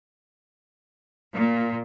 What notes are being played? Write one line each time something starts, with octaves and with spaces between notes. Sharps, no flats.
A#2